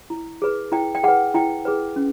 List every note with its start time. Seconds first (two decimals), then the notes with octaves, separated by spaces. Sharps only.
0.10 E4
0.42 G#4 B4
0.72 E4 G5
0.95 G5
1.03 G#4 B4 F#5
1.34 E4 G5
1.65 G#4 B4
1.96 C#4